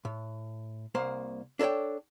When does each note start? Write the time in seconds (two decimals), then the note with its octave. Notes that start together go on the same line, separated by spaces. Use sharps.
0.05 A2
0.95 C2 A#3 C5
1.59 D4 A4 A#4 C#5 G5